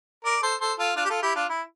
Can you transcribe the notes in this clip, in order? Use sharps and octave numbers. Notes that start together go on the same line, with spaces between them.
A#4 D5
A4 C5
A4 C5
F4 A4
D4 F4
G4
F4 A4
E4 G4
D4 F4
E4